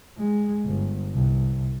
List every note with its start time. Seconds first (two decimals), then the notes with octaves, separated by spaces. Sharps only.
0.18 G#3
0.65 G1
1.14 C2